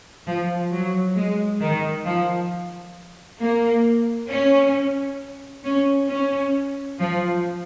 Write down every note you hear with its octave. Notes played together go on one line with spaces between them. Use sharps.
F3
F#3
G#3
D#3
F3
A#3
C#4
C#4
C#4
F3